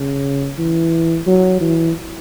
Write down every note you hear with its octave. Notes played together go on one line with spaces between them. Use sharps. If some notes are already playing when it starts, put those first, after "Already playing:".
Already playing: C#3
E3
F#3
E3